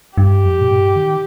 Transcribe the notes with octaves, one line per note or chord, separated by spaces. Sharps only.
G2 G4
F2
A#2
G2
D#3